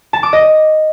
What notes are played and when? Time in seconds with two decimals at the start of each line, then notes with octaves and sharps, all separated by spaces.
0.13 A5
0.23 D6
0.33 D#5